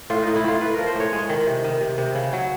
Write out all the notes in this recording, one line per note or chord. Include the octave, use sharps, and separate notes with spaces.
A2 F4
A2 D#4
E4
A2 F4
A2 B4
F3 A#4
C5
A2 C#5
G#3
D#3
C3
D#3
C3
C3
C#3
F#3